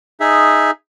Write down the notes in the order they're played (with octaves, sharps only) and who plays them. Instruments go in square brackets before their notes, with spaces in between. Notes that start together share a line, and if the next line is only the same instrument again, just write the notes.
[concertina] D#4 G#4 E5